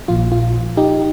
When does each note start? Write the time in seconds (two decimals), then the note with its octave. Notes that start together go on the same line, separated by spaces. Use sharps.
0.08 A#1 A#2 F3 F4
0.32 F4
0.77 D#4 G4